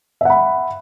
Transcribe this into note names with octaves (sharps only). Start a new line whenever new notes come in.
E5 F#5 B5